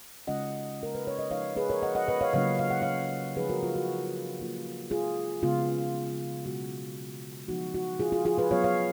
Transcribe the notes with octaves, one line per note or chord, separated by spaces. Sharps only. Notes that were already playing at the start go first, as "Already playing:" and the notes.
C#3 G#3 C#4 F4 D#5 F#5
A#4
B4
C#5
D#5
F3 G#3 D#4 C#5 F5
G#4 B4
A#4 C#5
D#5 F#5
D#5 F#5
B4 D#5
C#5 F5
C#3 F#3 A#3 C#4 F4 C#5 F5
F5
F#5
C#5 F5
F3 G#3 D#4 G#4 B4
F#4 A#4
F4
F#4
F#3 A#3 F4
F4 G#4
C#3 G#3 B3 F4
B2 G#3 B3 F4 F#4
F3 G#3 B3 D#4 F#4
F#4
F4 G#4
F4 G#4
F4 G#4
G#4 B4
F#3 B3 F4 C#5 F5
C#5 F5